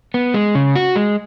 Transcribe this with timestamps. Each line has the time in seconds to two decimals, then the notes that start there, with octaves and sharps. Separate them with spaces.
0.14 B3
0.34 G#3
0.55 C#3
0.76 F#4
0.96 G#3